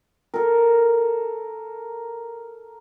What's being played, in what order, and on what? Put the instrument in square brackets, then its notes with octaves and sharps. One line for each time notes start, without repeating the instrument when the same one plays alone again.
[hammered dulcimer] A4 A#4